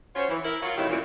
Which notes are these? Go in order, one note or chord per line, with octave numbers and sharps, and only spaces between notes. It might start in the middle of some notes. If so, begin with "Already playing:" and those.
C#4 F4 F#4 C5 C#5
E3
E4 A#4
F#3 F4
A2 C3 D#3 F#3 E4 G4
F#2 A#2 E3